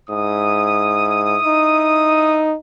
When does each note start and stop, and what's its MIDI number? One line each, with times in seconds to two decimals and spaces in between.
0.10 1.37 44
0.10 2.48 64
0.10 2.48 87
1.44 2.56 63